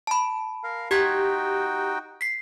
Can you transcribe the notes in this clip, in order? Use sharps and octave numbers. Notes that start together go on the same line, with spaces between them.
A5 B5
A#4 F5
D#4 F#4 G4 G5 G#6 B6
B6 C7